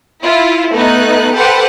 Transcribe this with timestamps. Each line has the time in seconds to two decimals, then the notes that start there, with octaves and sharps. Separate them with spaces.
0.24 E4 F4
0.72 A3 B3 D#4 F#6
1.34 G4 A4 B4 C5 F#5